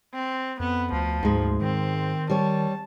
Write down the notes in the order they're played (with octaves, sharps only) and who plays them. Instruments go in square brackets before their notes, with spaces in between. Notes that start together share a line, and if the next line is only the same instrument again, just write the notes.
[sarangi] C4
[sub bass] F2 [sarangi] B3
[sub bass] D2 [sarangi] F3
[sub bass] D2 [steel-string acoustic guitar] G#2 G#3
[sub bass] D#3 [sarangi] C4
[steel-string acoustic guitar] G3 C#5 [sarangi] A5